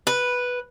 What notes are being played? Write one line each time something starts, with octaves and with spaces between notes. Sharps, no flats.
B4